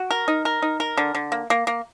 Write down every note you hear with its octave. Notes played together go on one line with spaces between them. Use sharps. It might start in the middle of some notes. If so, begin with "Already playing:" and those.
Already playing: F#4
A#4
D#4
A#4
D#4
A#4
D3
D3
A#3
A#3
A#3